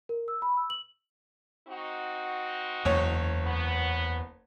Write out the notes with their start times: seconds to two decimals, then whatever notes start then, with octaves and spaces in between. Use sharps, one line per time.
0.09 A#4
0.28 E6
0.42 B5
0.57 E6
0.70 F#7
1.68 C4 D#4 F#4
2.85 F#1 E2 C#5
3.44 B3